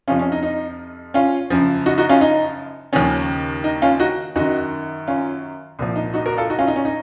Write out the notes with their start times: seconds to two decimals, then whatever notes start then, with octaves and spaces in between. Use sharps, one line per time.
0.08 F2 C3 F3 C#4 F4
0.19 C#4
0.32 D#4
0.43 D#4
1.14 C#4 F4
1.50 F#2 C#3 F3
1.86 D#4 F#4
1.98 D#4 F#4
2.09 C#4 F4
2.21 D#4
2.93 D#2 C#3 F3 C#4
3.64 D#4
3.82 C#4 F4
4.00 D#4 F#4
4.36 F#2 D#3 D#4 F#4
5.08 C#4 F4
5.79 C2 A#2 F3
5.96 D#4
6.14 D#4 F#4
6.26 F#4 A#4
6.37 F4 A4
6.50 D#4 F#4
6.59 C#4 F4
6.67 D#4
6.76 C#4
6.85 D#4